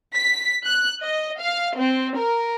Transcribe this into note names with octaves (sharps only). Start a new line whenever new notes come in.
B6
F#6
D#5
F5
C4
A#4